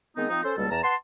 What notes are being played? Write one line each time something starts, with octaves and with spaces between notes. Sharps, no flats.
D#3 G#3 B3 C4 D#4
F3 C4 D#4
C#4 A4 C5
C#2 B2 G3 A#3 A4 A5
E2 A5 A#5
B4 F#5 A5 C6